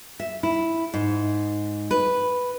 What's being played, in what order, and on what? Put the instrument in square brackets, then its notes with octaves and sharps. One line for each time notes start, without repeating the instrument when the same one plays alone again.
[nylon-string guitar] E5
E4
G#2
B4